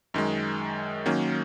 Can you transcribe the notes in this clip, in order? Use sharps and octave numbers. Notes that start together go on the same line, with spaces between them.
F#2 D#3 G#3
D#3 F#3 A#3 C#4